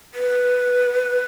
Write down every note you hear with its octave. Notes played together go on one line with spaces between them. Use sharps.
B4